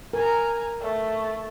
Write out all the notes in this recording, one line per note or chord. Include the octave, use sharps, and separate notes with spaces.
A#4 G#5 A#5
A3